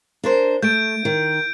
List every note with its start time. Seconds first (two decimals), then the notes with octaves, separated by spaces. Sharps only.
0.24 D4 A#4 C5
0.63 A3 G6 D7
1.05 D#3